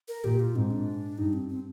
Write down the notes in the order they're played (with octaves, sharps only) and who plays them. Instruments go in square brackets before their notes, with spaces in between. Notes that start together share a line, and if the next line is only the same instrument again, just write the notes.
[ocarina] A#4
[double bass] A#2 [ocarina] G4
[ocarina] F4
[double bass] G#2 [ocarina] C4
[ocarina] D4
[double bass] G2 [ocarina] D#4
[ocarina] C4
C4